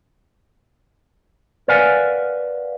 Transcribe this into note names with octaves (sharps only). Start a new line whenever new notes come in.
A#4 B4 D5 F5 F#5 G#5